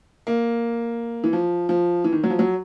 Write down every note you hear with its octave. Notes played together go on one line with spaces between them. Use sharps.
A#3
E3
F3
F3
E3
D#3
F#3
F3
F#3